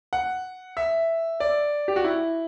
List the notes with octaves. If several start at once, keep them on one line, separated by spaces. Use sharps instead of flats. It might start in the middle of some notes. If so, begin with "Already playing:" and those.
F#5
E5
D5
G4
F#4
E4